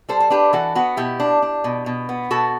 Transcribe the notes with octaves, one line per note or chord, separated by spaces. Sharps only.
G3 A4 C5
C5
D4 G4 B4
E3 F#4 A4
B3 F#4
B2 E4 G4
D4
D4
B2
B2
B3
B2 F#4 A4